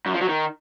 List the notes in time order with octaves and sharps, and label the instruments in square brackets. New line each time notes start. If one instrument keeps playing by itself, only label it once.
[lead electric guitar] F#2
F3
F#3
D#3